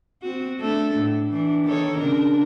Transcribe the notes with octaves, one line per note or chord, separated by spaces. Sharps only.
C4 F#4
A3 D4 A4
A2
E3 D4
D#3 A4 C#5
C#3 D4 A#4